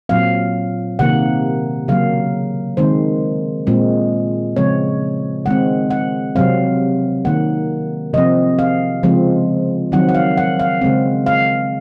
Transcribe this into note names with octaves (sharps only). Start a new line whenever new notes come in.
A#2 F#3 C4 F5
C3 D#3 A#3 F#5
C#3 F#3 A#3 F5
D#3 G#3 C4 C5
A#2 G#3 C4
C#3 F3 G#3 C4 C#5
D#3 G#3 C4 F#5
F#5
C3 F#3 C4 F5
D#3 A#3 F#5
C3 F3 C4 D#5
F5
C#3 F3 G#3 C4
D#3 F#3 C4 F#5
F#5
F5
F#5
F5
C#3 G#3 C4
F5